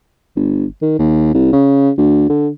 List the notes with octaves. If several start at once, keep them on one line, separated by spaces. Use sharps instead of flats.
G1
D#3
D#2
C2
C#3
D2
D3